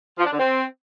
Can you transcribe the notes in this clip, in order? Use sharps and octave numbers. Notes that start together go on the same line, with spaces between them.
F3
D4
D3
C4